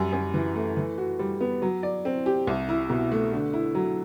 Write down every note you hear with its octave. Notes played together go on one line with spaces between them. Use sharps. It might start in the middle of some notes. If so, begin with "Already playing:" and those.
Already playing: F#2 G3
F#2
E3
A3
E3
F#4
G3
B3
F#3
D5
C4
G4
C2
E4
B2
A3
D3
E4
F#3